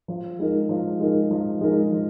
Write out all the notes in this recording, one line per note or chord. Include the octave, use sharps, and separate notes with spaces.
F3
G#3 D#4 A#4
F3
G#3 D#4 A#4
F3
G#3 D#4 A#4
F3